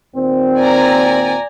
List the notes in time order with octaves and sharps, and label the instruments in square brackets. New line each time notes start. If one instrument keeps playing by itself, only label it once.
[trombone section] D#2 A#2 C4
[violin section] D5 G#5 A#5